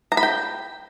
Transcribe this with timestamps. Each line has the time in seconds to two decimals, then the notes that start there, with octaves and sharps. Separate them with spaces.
0.12 A#5
0.17 B5
0.23 G5